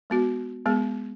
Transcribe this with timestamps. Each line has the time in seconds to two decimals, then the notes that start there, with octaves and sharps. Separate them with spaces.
0.10 G#3 B3 F#4
0.66 G#3 B3 G#4